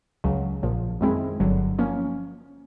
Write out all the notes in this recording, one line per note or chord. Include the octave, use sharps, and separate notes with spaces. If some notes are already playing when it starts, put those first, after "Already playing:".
C#2 C#3 F#3
A#1 A#2 F3
F#2 D#3 G#3 C4 E4
G1 G2 D3 F#3
F3 A#3 C#4